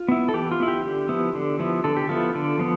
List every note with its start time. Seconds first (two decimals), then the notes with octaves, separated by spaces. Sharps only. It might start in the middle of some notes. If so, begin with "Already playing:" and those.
Already playing: F4
0.08 B3 E4
0.29 A4
0.34 E3 G4
0.51 F4
0.60 B3 E4
0.68 G4
0.85 D3
1.09 F3 B3 E4
1.35 D3
1.59 F3 B3 E4
1.84 D3 A4
1.97 G4
2.09 F3 B3 E4 F4 A4
2.35 D3
2.59 F3 B3